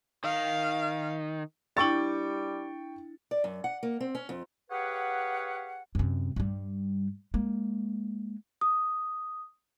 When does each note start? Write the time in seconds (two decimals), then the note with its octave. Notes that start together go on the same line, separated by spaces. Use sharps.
0.24 D#3 F5
1.77 G3 D4 E4 G5 C#6 A6
3.31 D5
3.44 F#2
3.64 F#5
3.83 A#3
4.00 C4
4.15 C#4
4.29 F2
4.71 G4 G#4 B4 C#5 F5 F#5
5.95 F#2 C3
6.36 G2 G3
7.34 G#3 A#3
8.61 D#6